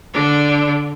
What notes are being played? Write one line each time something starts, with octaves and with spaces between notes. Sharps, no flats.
D3 D4